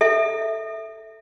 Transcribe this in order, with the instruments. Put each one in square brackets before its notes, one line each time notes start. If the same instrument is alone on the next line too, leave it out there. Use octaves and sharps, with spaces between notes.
[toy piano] A4 E5